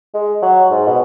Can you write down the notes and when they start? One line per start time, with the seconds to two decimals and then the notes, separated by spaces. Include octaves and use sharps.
0.14 G#3
0.42 F#3
0.70 G#2
0.88 B2